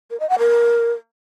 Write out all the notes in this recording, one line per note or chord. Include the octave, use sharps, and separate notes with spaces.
A#4
D#5
F#5
A#4